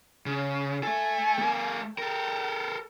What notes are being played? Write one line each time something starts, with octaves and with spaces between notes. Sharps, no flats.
C#3
A3 A4 G#5
A3 A#4
A4 A#4 G5